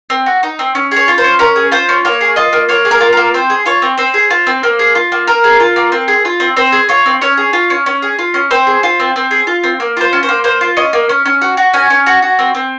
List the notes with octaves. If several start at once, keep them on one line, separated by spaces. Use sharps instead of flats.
C4
F#4
D#4
C4
C#4
G#4 C#5
F4
C5
C#4
C#4 A#4
G#4
F4 C5
C#4
A#3 C#5
G#4
F4 D#5
A#3
A#3 C#5
G#4
A#4
F4
A#3 A#4
C4 C5
G#4
F4 C#5
C4
C4 C5
G#4
F4
C4
A#3
G#4
F4
A#3
A#3 A#4
G#4
F4
A#3
C4
G#4
F4
C4
C4 C5
G#4
F4 C#5
C4
C#4 C#5
G#4
F4
C#4
C#4
G#4
F4
C#4
C4 C5
G#4
F4
C4
C4
G#4
F4
C4
A#3
F4 C5
C#4
C5
A#3
A#3 C5
F4
C#4 D#5
A#3
C#4
C#4
F#4
F#4
C#4 G#5
C#4
F#4
F#4
C4
C4